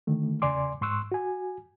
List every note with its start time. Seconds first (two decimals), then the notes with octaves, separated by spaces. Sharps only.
0.07 D3 D#3 A3
0.42 E2 C#3 D5 G#5 C6 D6
0.81 G#2 C6 C#6 E6 F#6
1.12 F#4 G#5